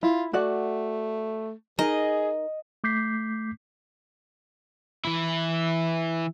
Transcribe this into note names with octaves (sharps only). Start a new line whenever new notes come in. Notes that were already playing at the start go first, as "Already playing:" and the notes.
E4 F4
A3 F#4 D5 F#5
D#4 G#4 A#4 D#5
A3 D6 G6 B6 C7
E3 E4